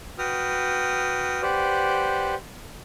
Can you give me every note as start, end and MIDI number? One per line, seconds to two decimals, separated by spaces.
0.18 1.41 66
0.18 1.41 71
0.18 1.41 79
0.18 1.41 87
0.18 1.41 89
1.42 2.35 67
1.42 2.35 71
1.42 2.35 72
1.42 2.35 74
1.42 2.35 78